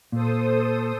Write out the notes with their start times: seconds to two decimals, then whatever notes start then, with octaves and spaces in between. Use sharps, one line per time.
0.12 A#2 A4 C5 D#6